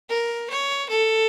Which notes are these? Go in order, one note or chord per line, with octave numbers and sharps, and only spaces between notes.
A#4
C#5
A4